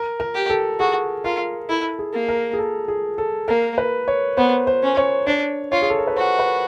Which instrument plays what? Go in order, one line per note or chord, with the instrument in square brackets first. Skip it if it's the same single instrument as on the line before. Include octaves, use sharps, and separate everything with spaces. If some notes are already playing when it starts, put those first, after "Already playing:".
Already playing: [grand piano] A#4
A#4
[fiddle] G4
[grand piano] A4
[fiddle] F#4 [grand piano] G#4
[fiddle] F4 [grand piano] A#4
[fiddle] E4 [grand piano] A4
[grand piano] G#4
[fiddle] A#3
[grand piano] A#4
G#4
A4
G#4
A4
[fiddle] A#3 [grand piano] A#4
[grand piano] B4
C#5
[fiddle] B3 [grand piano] C5
[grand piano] C5
[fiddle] C#4
[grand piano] C#5
[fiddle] D4 [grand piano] C#5
[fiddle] F4 [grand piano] C#5
[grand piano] G#4
A4
A#4
B4
[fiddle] F#4 [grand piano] C5
[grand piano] B4